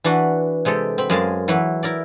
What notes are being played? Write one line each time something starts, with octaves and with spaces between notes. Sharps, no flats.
E3 D4 F#4 B4
C3 G#3 G4 A4
C4 B5
F#2 G#3 G#4 A#4 F5 A5
E3 F#3 E4 B4
E4 A#4 D5